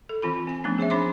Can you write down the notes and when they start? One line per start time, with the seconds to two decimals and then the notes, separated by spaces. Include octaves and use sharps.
0.09 A4
0.22 E3 C4 F4 B5
0.47 C4 G#5
0.64 F3 A3 B3 C#4 D4
0.78 G#4 C5 C#5 E5
0.90 C4 D4 C5 B5 C6 D6